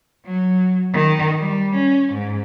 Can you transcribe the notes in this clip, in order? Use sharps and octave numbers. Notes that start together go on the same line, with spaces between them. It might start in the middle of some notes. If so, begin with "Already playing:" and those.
F#3
D#3
G3
C#4
G#2